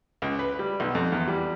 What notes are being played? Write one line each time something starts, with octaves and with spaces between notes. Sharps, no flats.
C#2
B4
G3
B1
F2
E2
G3